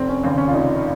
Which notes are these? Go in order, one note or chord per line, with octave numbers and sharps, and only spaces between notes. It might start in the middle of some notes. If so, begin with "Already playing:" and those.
Already playing: F1 C4
C#4
D#2 C#3 C4
C#4
F4
F1 D#4